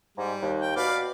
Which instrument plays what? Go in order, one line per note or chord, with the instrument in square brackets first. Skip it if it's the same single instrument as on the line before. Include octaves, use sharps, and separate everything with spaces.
[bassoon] G#2 [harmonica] G3
[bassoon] D#2
[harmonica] G5
[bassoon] B2 [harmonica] D5 F5 B5